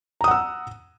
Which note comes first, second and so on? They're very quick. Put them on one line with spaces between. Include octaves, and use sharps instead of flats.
A#5 D#6 F#5 E6